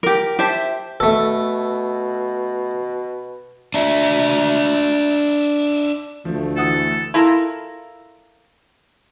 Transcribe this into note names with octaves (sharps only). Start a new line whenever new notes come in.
G4 A#4
G4 C5 E5 A5
B2 A3 A4
D4 E5
D2 F3 A3
E3 A4 F#5 D#6
E4 F4 A4 A#4